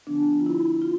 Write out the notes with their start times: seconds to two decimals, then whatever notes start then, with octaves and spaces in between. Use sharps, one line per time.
0.07 D3 F3 B3 D4
0.40 F4
0.46 E4
0.82 F4